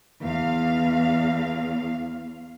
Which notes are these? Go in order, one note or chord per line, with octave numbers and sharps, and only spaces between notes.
E2 F5